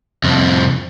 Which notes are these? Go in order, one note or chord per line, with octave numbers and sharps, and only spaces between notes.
C2 F2